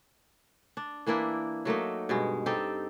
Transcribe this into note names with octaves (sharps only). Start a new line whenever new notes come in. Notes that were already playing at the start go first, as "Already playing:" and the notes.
D4
E3 A#3 D4 E4
F#3 A3 A#3 D#4
G2 B2 G#3
C4 D#4 G4 A4